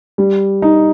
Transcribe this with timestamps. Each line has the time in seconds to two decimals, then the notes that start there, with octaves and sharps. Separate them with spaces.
0.18 G3
0.62 D#4